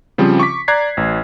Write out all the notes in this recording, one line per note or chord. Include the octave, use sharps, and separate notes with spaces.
C#3 F3 G3 C4
C#6 D6 B6
D5 A#5 F#6 G#6 C7
A1